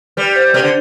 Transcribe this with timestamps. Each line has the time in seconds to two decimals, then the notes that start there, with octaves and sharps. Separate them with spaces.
0.17 G3 B4
0.36 C5
0.54 C3 B4 D5
0.62 D3